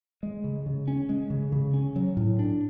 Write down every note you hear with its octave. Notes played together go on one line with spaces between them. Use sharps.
G#3
C#3
C#3
C#4
G#3
C#3
C#3
C#4
F#3
A2
D4